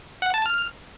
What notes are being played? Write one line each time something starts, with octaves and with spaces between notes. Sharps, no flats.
F#5
A5
F6